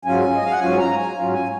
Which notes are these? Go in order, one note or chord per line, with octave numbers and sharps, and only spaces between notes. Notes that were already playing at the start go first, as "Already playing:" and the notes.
G#2 F#3 C#4 F4 G#5
D#5
F5
F#5
G#2 F#3 C#4 F4 G#5
A#5
G#5
G#2 F#3 C#4 F4
G#5